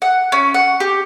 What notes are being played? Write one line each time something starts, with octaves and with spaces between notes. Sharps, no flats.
F#5
C#4
F#5
G4